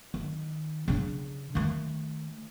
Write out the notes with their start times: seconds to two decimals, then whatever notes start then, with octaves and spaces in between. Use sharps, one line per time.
0.14 D#3
0.88 C#3 D4
1.55 D#3 A3